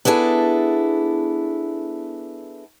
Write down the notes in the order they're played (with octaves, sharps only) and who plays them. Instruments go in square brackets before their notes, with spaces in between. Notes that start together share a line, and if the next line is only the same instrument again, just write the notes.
[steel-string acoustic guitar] B3 D4 E4 G#4 A4